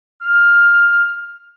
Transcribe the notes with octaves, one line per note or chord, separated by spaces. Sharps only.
F6